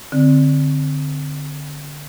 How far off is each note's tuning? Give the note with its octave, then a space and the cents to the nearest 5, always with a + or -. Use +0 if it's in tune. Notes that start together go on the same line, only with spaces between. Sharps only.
D3 +0 C4 +0